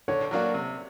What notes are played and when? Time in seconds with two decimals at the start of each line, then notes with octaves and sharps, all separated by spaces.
0.08 D3 C#5
0.31 F#3 A#3 D4 F#4
0.54 C3